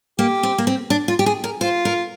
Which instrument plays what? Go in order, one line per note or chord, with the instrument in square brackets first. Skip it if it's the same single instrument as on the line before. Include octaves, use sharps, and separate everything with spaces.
[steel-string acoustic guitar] A#3 [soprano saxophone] G4
[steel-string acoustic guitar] C4
A#3
C4
D4
F4
G4
G#4
A#4
[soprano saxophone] F4 [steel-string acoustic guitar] C5
[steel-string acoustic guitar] A#4